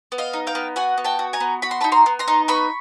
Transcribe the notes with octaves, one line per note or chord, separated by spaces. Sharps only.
B3
D#5 F5
D#4
F5 G5
B3
F#4 F#5 G#5
B3
G5 A5
F#4
G#5 A#5
B3
F#4 B5
C6
A5 B5
D#4
A#5 C6
B3
A#5 C6
D#4
B3 B5 C#6